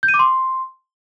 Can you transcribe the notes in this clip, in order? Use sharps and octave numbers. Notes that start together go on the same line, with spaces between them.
G6
D#7
D6
C6